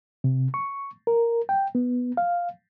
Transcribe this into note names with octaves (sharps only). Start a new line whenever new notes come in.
C3
C#6
A#4
G5
B3
F5